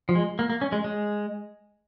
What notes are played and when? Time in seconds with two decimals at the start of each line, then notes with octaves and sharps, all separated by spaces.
0.09 F3
0.15 G#3
0.39 A#3
0.50 A#3
0.61 C#4
0.72 G#3
0.84 G#3